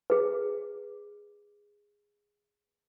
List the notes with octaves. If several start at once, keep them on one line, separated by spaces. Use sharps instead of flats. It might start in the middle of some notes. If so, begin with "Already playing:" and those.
G#4 B4